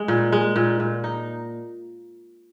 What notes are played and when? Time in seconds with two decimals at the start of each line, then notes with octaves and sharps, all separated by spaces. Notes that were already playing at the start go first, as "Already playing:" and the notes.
Already playing: G#3
0.08 A#2
0.32 G#3
0.56 A#2
0.80 A#2
1.04 D#4